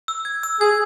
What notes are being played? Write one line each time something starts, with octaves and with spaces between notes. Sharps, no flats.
E6
G#6
E6
G#4 G#6